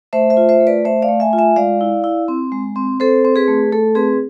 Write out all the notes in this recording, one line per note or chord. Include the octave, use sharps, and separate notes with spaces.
A3 C5 E5
C5 E5
F4
C5 E5
A3
B4 D5
A3 C5 E5
D5 F5
A3
E5 G#5
F4
E5 G#5
G#3 D5 F5
E4
E4
C4
G#3
C4
C4 A4 C5
C4
G#4 B4
A3
A3 A4
C4 G#4 B4